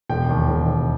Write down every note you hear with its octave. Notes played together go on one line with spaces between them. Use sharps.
E1 G5
D#2
E1
E1